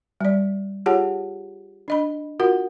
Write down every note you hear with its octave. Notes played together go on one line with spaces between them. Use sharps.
G3 D5
F4 G4 G#4 C#5 F#5 A5
D4 D#5 B5
F4 F#4 A#4 F#5